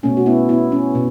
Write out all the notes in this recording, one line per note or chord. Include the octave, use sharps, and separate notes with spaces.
B2 A3 C#4
F#4
B3 E4
B3 E4
C#4
B2